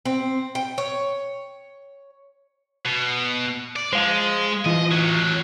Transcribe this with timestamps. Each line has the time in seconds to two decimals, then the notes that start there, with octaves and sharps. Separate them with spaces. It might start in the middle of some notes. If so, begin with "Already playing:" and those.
0.05 C4
0.55 G5
0.78 C#5
2.85 B2
3.76 D5
3.93 G#3 C5 F5
4.66 E3 F4 D#5
4.91 A2 F#3